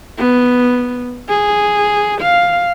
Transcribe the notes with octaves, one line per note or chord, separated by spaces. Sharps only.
B3
G#4
F5